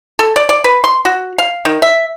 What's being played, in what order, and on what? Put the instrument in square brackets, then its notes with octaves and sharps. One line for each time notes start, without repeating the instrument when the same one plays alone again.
[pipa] A4
D5
D5
B4
C6
F#4
F5
D#3
E5